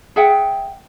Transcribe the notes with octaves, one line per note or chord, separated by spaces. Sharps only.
G#4 E5 F#5 G5